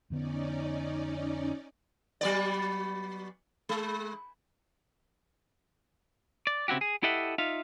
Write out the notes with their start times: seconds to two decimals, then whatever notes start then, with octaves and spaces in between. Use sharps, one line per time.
0.10 F2 D3 B3 C#4 D#4 D5
2.21 F#3 B3 D5
3.69 G#3
6.47 D5
6.68 C#3 C4 E4 F#4 G4
6.81 G#4
7.03 E4 G4 A4 D#5 E5 F#5
7.38 D#4 F4 E5 F5